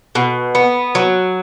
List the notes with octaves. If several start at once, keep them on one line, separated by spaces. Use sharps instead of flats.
B2
B3
F#3